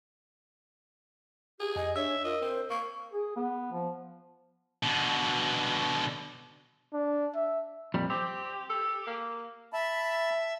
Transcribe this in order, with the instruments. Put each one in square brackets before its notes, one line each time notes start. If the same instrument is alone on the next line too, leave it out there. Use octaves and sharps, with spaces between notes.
[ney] G4 [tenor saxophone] G#4
[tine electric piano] F2 G#5 [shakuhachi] D#5
[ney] D4 [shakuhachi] C#5 [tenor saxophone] E5 [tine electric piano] E6
[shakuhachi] F4 [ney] A#4 [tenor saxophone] D#5
[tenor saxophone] C4 [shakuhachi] C5
[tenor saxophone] A#3 [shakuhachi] C#6
[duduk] G#4
B3
F3
[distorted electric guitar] B2 D3
[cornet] D4
E5
[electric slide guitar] F2 A#2 G3
[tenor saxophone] C4 [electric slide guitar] G4
[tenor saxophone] A4
A#3
[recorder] E5 [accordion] A5 B5